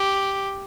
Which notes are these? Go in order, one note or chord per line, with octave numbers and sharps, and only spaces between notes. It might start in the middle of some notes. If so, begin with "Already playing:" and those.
Already playing: G4